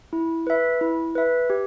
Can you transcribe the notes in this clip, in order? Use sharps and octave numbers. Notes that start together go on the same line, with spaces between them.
E4
B4 E5
E4
B4 E5
G4